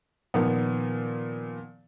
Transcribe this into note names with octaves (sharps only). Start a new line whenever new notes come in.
A#2 D#3 F3 B3